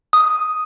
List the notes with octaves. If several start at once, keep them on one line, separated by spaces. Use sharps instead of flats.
D#6